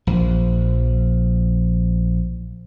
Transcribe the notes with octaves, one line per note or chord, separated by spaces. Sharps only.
A#1 F3